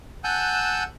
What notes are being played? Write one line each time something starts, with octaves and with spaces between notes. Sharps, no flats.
F#5 G#5 A5 E6 F#6 G6